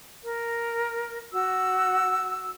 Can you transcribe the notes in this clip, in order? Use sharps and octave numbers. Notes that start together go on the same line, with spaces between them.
A#4
F#4 E6